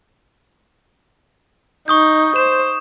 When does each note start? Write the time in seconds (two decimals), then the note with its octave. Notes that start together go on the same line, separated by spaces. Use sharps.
1.88 D#4 C#6 D#6 G6
2.36 C5 E7